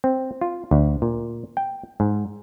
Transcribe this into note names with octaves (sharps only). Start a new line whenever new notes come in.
C4
F4
D2
A#2
G5
G#2